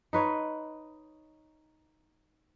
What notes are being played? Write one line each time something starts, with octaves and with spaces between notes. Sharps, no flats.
D#4 B4 C#5